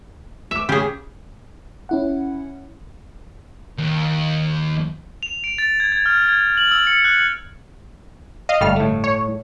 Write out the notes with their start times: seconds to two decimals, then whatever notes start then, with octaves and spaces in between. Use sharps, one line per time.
0.51 E5 D6 E7
0.69 C#3 G4 G#4
1.89 C#4 E4 F#5
3.78 D#2
5.23 F7
5.44 D7
5.58 A6
5.80 G#6
5.92 G#6
6.06 F6
6.29 G#6
6.41 G#6
6.57 F#7
6.71 E6
6.87 C#7
7.05 F#6
8.49 D#5 F5
8.61 G1 G3 A3 F6
8.76 A2 A3
9.04 C#5